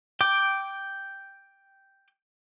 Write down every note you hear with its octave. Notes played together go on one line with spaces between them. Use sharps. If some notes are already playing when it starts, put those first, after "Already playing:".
G5 D6